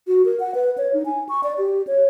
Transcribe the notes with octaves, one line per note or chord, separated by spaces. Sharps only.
F#4
A#4
F#5
B4
C#5
D#4
G#5
C#6
D5
G4
C#5